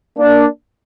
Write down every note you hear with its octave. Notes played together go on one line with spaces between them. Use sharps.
A#3 D4